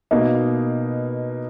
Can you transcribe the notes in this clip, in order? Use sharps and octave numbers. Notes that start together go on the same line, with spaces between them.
B2 A#3 D#4